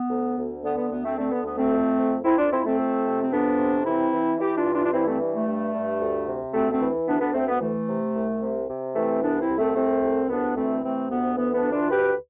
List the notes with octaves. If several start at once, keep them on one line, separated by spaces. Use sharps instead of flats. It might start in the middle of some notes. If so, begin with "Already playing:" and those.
Already playing: B3
D2
D2
D3 B3
B3
D2 B3
A3 C4
D3 A3 C4
B3
D2 B3
A3 C4
F2
F2
F2 C4 E4
D4 F4
F2 C4 E4
A3 C4
F2
C3
C4
F2 B3 D4
C3
E3 C4 E4
E3
E3 E4 G4
D4 F4
G2
D4 F4
D4
E3 C4 E4
A3 C4
G2
A3
G2
G2
D2
C3
D2 A3 C4
A3 C4
E3
D2 B3 D4
B3 D4
D2 A3 C4
B3
E3 A3
C3
C2
C3
C3
E3 A3 C4
C2 B3 D4
C4 E4
C2
A3 C4
C2 A3 C4
C2
D2 B3 D4
E3 A3 C4
C3 A3 C4
D2 B3
E3 B3
B3 D4
D2
D4 F4
D2 G4 B4